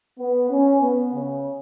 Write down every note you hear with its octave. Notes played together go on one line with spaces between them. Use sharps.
B3
C#4
B3
C#3